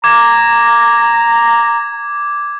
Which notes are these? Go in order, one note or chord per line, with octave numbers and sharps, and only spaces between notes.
A#5 D6 G#6